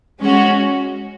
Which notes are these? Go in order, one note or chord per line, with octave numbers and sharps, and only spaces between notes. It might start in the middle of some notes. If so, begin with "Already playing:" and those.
G#3 C#4 F#4